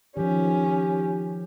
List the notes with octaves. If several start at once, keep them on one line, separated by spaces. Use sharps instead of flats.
D#3 F3 C#4 G4